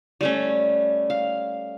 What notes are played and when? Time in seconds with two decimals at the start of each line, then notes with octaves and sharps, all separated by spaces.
0.21 G3 A3 C#4
1.10 F5